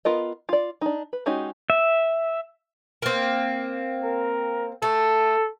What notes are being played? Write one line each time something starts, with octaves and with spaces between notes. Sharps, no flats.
B3 F4 A#4 D#5
F4 D5
D4 D#4
B4
G#3 C#4 D#4 F#4 G4
E5
A#3 C4
A#4
A3 A4